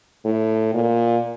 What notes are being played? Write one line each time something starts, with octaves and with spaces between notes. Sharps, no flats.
A2
A#2